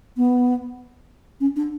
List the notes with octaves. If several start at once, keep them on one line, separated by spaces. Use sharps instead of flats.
B3
C#4
D4